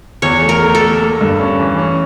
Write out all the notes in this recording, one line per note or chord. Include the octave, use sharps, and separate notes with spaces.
E2 C#5
A3
A#4
A3
A4
A3
A#3
G2
C#4
E3
C#4